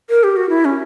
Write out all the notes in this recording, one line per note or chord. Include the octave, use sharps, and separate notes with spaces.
A#4
G4
F#4
E4
C#4